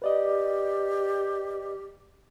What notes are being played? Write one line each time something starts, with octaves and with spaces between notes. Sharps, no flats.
G4 B4 D5 D#5